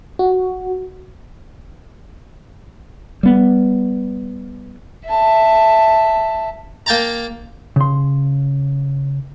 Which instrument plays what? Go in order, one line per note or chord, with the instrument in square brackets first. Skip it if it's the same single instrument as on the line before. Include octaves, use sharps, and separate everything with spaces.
[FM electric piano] F#4
[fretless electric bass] G3 B3
[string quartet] E5 A5
[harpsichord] A#3 G5 A5 A#5
[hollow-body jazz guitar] C#3 C6